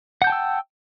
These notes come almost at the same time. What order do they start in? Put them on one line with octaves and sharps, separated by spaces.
F#5 G6 A5 G5 E6